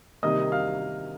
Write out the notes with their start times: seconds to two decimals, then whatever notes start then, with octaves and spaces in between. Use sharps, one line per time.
0.23 C3 D#3 G3 A#3 D#5 D#6
0.52 F5 F6